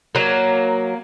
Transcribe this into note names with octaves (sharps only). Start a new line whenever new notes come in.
F#3 A#3